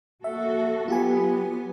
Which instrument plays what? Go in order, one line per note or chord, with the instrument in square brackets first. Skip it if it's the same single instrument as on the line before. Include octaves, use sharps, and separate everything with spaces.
[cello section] A#3 F#4 A4 [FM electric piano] E5
[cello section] F#3 B3 [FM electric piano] F4 G4 G#5